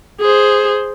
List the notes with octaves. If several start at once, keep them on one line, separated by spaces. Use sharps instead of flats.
G#4 C5